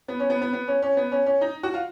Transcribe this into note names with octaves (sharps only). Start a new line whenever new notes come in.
B3
C#4
B3
B3
B3
C#4
C#4
B3
C#4
C#4
D#4
F#4
F4